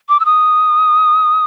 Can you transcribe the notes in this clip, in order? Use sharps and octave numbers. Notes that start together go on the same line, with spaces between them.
D6
E6
D#6